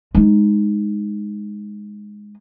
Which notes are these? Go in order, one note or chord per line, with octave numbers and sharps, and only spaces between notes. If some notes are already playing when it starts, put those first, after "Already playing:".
G#3 D#4